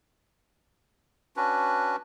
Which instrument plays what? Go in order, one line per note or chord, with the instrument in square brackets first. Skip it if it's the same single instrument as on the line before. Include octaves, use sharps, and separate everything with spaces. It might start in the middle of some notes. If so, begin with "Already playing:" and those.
[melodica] C#4 D4 F#4 B4